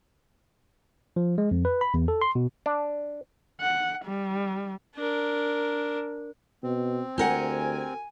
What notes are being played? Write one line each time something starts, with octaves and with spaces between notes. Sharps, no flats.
F3
G#3
F2
B4
B5
E2
A4
C6
B2
D4
F#5
G3
D4 A#4
B2 C4
D2 G4 A#4 F#5 G#5